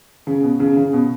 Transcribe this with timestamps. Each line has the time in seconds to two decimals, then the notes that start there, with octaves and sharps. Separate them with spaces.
0.27 C#3
0.43 B2
0.60 C#3
0.77 C#3
0.93 B2